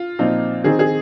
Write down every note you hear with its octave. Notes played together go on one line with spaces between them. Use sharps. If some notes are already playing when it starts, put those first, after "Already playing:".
Already playing: F4
A#2 F3 C4 D#4
D#3 C4 D#4 G#4
G#4